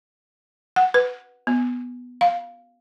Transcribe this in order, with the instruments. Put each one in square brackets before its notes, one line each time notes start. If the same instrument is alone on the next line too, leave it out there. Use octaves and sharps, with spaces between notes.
[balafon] F#5
B4
B3
F5